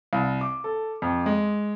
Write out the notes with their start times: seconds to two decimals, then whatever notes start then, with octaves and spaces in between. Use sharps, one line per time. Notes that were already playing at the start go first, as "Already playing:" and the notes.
0.13 C2
0.41 D6
0.64 A4
1.02 F2
1.26 G#3